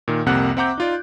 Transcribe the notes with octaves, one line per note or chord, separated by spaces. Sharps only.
A#2 D#3
C2 F2 C3 A#3 F#5 F#6
C4 E5 F#5 A#5 D6 G6
D#4 F4 D5